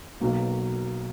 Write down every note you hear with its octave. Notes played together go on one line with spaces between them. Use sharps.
B1 B2 F#3 A#3